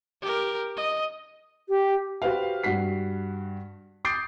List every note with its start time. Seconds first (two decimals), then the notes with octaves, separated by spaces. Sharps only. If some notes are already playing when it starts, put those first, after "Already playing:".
0.22 G4 A#4
0.77 D#5
1.69 G4
2.22 F#4 G4 B4 C5 F5
2.63 G2 F#4 F#5 B6 C7
4.05 D6 D#6 G6 A6 C7 D7